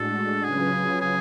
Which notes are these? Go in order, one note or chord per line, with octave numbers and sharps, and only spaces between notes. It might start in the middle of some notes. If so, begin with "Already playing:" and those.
Already playing: A2 G#3 D4 F#4 A4
C#3 F#3 C#4 F4 G#4 B4
G#4